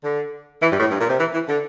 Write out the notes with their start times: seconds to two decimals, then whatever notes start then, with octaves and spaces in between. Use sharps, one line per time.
0.04 D3
0.61 E3
0.71 G2
0.80 A2
0.90 G2
1.00 A#2
1.09 C3
1.19 E3
1.33 E3
1.48 D3